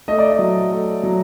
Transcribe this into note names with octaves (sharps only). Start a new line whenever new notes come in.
A3 D#5
D5
D#5
F#3
A3
F#3